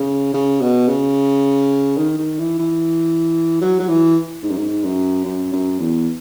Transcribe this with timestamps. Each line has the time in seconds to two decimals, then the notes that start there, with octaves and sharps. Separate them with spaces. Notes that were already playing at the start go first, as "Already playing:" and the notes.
Already playing: C#3
0.34 C#3
0.61 B2
0.88 C#3
1.97 D#3
2.18 D#3
2.38 E3
2.59 E3
3.61 F#3
3.80 F#3
3.88 E3
4.43 G#2
4.50 F#2
4.57 G#2
4.84 F#2
5.25 F#2
5.52 F#2
5.79 E2